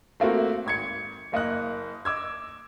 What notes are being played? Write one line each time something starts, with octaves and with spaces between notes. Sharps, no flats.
A3 A#3 C4 F#4
G#1 G#6 C#7
F#1 A#3 D#5 F#6
D#5 D6 E6 G#6